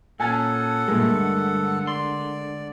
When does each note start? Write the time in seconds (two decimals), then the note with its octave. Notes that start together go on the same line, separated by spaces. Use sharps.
0.20 A#2 C#4 A4 F#5 G#5 A5
0.88 G2 A#2 G#3 A3 G#4 A#4
1.17 D3
1.87 D5 C6